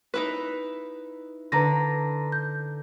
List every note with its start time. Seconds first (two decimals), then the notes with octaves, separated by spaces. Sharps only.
0.14 D#4 E4 B4
1.52 D3 B4 A#5 A#6
2.32 G6